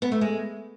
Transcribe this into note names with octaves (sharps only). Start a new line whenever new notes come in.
B3
A3
G#3